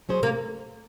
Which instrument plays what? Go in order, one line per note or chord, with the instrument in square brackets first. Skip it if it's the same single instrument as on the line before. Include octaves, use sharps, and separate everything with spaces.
[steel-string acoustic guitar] F#3 C#4 G#4 C5
[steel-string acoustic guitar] C3 [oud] A#3